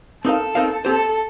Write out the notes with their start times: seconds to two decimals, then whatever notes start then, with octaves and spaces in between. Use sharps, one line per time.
0.24 C4 D#4 A4 A#4 F5
0.55 C4 D#4 A#4 F5
0.85 C4 G4 A4 C5